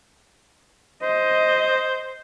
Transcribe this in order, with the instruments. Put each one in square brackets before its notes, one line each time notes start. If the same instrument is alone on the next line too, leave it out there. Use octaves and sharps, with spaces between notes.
[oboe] C5 [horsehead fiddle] D#5